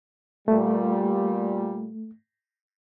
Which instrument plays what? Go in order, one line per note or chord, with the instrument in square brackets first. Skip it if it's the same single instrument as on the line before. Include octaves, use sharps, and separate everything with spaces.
[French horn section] A#2 G3 [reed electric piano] A3